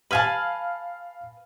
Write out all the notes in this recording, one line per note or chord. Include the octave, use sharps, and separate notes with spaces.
B4 F5 G#5 A5 F6 F#7